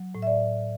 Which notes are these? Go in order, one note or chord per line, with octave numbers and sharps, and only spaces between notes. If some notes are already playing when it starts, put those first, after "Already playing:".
Already playing: F#3
A2
E5
D5